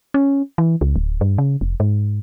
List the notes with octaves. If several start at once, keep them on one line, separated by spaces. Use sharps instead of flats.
C#4
E3
C#2
D1
G2
C#3
F1
G#2